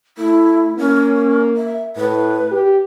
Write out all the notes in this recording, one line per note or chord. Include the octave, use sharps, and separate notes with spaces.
A3 E4
A#3 C#4
E5
A2 B4
G4